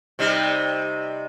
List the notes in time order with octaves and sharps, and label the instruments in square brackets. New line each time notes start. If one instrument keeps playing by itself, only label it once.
[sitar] C3 G3 D#4